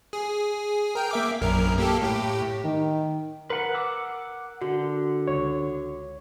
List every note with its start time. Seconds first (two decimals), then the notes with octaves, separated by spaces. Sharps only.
0.13 G#4
0.95 A#4 G5
1.11 A#3 E5 D6
1.42 A#1 F#2 A#4
1.78 A#3 G4 A4
2.01 A2 G4
2.64 D#3
3.50 A#4 B4 F#5
3.74 F#5 D6 E6
4.62 D3 F#4
5.28 C#2 C#5